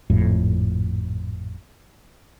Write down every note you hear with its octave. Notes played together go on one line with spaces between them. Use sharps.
G#1 F2 A2